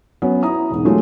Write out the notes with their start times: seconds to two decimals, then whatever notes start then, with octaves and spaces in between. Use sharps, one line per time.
0.22 F#3 B3 C#4
0.43 E4 A#5 D#6
0.71 E1 G#2
0.85 F#3 G#3 A3 C#4 F4